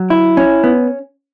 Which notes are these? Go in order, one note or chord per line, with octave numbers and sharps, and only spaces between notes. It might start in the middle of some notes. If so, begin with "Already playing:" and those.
Already playing: F#3
E4
C#4
B3